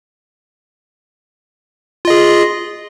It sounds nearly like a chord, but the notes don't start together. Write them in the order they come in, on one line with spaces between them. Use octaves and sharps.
F4 D#5 G#4